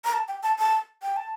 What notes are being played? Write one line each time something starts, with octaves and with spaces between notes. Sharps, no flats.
A#5
A5
G5
A5
A5
G5
A5